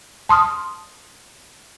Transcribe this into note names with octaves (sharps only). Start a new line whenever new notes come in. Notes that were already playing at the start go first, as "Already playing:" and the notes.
A5 C6 D#6 F6